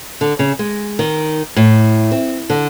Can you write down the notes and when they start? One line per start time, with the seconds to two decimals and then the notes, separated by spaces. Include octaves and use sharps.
0.21 D3
0.39 C#3
0.59 G#3
0.99 D#3
1.56 A2
2.12 C4
2.50 D3